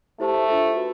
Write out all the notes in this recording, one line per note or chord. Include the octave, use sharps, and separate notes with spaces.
A3 E4 G4 C5 E5 A5
D4 F4 A4 C5 E5
F#4 B4